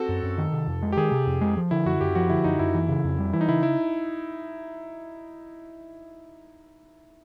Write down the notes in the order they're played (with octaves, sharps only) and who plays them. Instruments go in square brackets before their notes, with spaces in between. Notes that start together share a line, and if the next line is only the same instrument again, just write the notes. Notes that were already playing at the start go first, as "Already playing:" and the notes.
Already playing: [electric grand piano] C4 F#4 A4
[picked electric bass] F#2
F#2
D#3
C3
F2
G#3
[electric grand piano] G4
[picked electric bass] D#3 [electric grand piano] G#4
[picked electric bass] C3
F2
G#3
F3
[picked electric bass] D3 [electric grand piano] E4
[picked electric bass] F#2 [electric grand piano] F#4
[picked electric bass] F#2 [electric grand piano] G4
[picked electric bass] F3 [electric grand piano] F#4
[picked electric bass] D3 [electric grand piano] E4
[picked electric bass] F#2 [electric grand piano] D#4
[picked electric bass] F#2 [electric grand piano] E4
[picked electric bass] E3
C#3
F2
G3
[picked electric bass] E3 [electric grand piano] E4
[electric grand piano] D#4
[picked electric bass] C#3 [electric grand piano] E4
[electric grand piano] E4